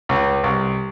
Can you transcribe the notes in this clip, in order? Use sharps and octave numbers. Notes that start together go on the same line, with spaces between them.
C#2
C2